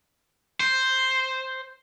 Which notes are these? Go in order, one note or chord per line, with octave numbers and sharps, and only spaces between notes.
C5